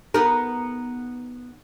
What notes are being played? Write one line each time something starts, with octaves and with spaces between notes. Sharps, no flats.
B3 D#4 A#4